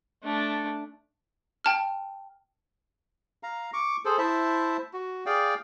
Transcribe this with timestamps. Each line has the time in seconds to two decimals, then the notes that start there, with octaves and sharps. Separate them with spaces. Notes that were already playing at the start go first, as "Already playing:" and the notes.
0.23 A3 D4
1.64 G5 A5 F6
3.43 F5 A#5
3.73 C#6 D6
4.05 G#4 A4 C5
4.18 E4 C5 E5 A5
4.93 F#4
5.26 G#4 D5 F5 G5